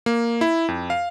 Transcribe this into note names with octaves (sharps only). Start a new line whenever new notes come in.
A#3
E4
F2
F5